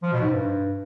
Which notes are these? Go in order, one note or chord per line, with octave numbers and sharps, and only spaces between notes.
F3
B2
G#2
G2